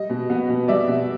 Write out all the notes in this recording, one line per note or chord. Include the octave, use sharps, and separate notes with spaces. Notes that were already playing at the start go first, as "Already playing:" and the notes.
Already playing: G3 D#5
B2
B3
B2
G3 D5 E5
B2